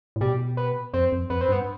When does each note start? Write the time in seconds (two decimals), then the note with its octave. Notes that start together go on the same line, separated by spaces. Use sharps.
0.16 A2
0.21 B2 G3
0.57 B3
0.93 F2 C4
1.12 F2
1.30 F2 B3
1.41 C4
1.48 G2 B3